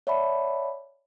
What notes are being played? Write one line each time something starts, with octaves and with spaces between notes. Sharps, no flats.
C#5 D5 E5 F#5 A5 B5